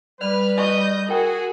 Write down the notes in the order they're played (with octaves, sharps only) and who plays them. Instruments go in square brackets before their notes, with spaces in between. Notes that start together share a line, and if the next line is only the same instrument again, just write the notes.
[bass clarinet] G3 [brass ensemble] B4 [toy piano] D5 [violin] F6
[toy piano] F#4 C#6 [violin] D#5 G6
[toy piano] F4 A#4 G5 [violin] F#4 [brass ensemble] G#4